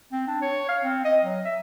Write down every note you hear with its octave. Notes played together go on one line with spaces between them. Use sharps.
C4
D4
C#5
F5
C4
D#5
F#3
E5